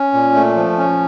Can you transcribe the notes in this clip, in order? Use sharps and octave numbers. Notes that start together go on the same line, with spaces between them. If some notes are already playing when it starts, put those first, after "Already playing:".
Already playing: C#4
A#2
A3
F3
C#4